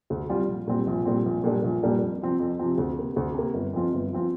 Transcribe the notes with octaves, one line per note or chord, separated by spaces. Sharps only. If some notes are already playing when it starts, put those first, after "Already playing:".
D2
C3 G3 C4 F4
A#1
A#2 G3 C4
A#1
A#2 G3 C4
A#1
A#2 G3 A#3 D4
A#1
A#2 G3 A#3 D4
F2
C3 F3 C4
F2
C3 F3 C4
D2
C3 A#3
D2
C3 A#3
G1
F2 F3 C4 F4
G1
F3 C4 F4